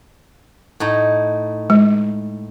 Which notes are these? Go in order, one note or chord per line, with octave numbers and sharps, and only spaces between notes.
A2 D#4
G#3